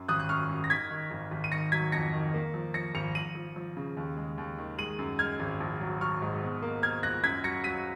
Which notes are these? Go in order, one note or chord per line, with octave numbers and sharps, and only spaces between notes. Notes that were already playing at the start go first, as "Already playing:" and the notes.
Already playing: F#2
G#1 D#6 F#6
F#6
F#2 C#6 F6
F#2
A#6
D#3 G#6 B6
D#3
G#1
G#1
D#7
D#3 A#6 C#7
F#3 G#6 B6
F2 A#6 C#7
D#3
A#3
F3
F3 A#6 C#7
G#1 C#7 F7
F3 D#7 F#7
F3
F3
C#3
D#2
G#3
D#2
D#3
G#3 D#7 F#7
F#2
G#3 F6 G#6
G#1
A#1
F#3
F#3 C#6 F6
G#2
B2
A#3
A#3 F6 G#6
C#2 F#6 A#6
F#2 G#6 B6
F#3 A#6 C#7
F#3 B6 D#7